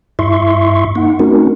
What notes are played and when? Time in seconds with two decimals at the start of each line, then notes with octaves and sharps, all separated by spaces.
0.19 G2 E4 E5 C6 C#6
0.95 A#3 D#4 F#5
1.19 A3 C4 C#4 D#4 F#4 A#4